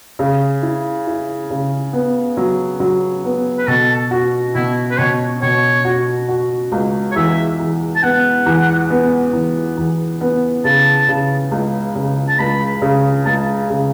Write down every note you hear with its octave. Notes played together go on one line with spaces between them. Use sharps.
C#3
E4
E4
C#3
B3
F#3
F#3
B3
B4
B2 A4
F#4
B2 E4
B4
B2 C#5
B2 C#5
F#4
F#4
C#2
C#5
E2 E5
E2
A5
B3 F#5
E2
B3
E2
E2
B3
C#3 A5
C#3
C#2
C#3
A5
C#2 B5
C#3
C#2 A5
C#3